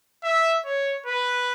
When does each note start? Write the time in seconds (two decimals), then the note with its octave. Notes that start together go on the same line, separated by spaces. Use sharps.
0.23 E5
0.65 C#5
1.06 B4